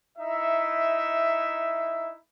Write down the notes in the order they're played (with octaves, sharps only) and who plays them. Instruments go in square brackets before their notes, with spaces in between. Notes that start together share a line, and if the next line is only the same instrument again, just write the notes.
[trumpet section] D#4 E4 E5